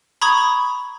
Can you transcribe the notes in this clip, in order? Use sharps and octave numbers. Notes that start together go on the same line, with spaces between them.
A#5 B5 C#6 D#6 G#6